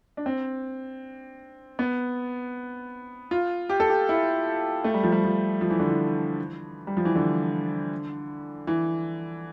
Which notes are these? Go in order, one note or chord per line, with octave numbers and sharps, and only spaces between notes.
D4
C4
B3
F4
G4
A4
G4
E4
A3
G3
F3
G3
F3
F3
E3
D3
E3
G3
F3
E3
D3
E3